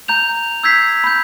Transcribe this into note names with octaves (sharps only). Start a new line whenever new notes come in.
A#5 G6 F7
E6 G6 G#6 B6 C7
B5 G6